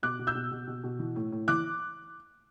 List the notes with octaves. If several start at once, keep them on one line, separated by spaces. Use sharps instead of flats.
B2 D6 F#6
B2
E6 G6
B2
B2
B2
B2
E3
A2
A2
E3 D6 F#6